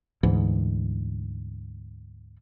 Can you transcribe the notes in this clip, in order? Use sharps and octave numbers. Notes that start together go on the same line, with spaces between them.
D2 G#2 E3